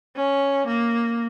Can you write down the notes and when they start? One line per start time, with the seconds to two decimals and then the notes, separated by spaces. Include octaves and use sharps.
0.16 C#4
0.67 A#3